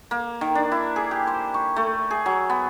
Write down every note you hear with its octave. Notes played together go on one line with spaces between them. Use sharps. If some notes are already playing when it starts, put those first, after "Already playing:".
A#3
D#3
D4
E4
G#4
G4
C5
C#6
A3
G#4
F#3
B3